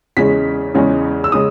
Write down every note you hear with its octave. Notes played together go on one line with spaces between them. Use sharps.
E2 C#3 G#3 C#4 B6
E2 C#3 G#3 C#4
E6
C#3 G#3 C#4 D#6